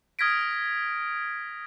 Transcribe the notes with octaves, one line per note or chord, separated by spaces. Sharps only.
D#6 F6 G#6 A#6 B6 D7